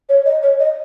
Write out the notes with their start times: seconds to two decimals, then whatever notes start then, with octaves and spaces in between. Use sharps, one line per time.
0.09 C#5
0.25 D#5
0.43 C#5
0.59 D#5